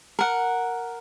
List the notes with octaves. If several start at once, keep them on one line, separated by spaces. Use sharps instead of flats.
A#4 F#5